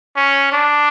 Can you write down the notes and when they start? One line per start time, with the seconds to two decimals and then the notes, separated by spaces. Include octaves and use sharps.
0.16 C#4
0.52 D4